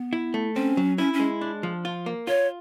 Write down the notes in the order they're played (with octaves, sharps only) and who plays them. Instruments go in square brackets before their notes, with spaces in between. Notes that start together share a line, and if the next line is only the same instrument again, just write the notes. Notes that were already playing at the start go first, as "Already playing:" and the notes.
Already playing: [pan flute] B3
[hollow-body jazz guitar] E4
A3
[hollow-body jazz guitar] C4 [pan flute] C#4
[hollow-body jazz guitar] F#3
[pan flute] C#4 [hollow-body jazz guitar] E4
[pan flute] C#4
[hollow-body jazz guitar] G#3
D4
F3
F4
A#3
[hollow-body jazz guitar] F4 [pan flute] C#5